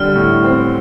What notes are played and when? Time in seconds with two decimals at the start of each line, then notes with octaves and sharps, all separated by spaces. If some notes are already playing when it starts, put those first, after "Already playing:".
Already playing: D3 G3 F6
0.15 A2
0.44 C4